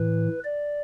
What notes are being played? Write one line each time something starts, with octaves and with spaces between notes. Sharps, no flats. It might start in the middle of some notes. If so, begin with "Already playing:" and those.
Already playing: A2 E3 B4
D5